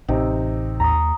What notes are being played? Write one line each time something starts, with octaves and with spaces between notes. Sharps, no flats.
A1 C3 C4 D#4
D#2 A#5 D#6